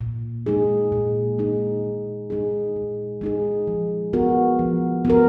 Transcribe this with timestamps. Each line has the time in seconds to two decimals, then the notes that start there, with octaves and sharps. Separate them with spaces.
0.01 A#2
0.46 G#3 D#4 G#4
0.92 A#2
1.38 G#3 D#4 G#4
1.84 A#2
2.30 G#3 D#4 G#4
2.76 A#2
3.21 G#3 D#4 G#4
3.67 F3
4.13 B3 F#4 A#4
4.59 F3
5.05 B3 F#4 A#4